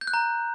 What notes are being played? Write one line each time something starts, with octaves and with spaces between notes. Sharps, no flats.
G6
F#6
A#5